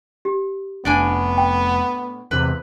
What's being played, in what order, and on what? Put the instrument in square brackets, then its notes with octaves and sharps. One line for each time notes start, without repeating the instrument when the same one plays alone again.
[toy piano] G4
[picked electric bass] F1 [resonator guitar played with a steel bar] A2 D4 G#5 [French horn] B3
[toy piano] G5
[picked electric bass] E2 C3 [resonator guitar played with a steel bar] B4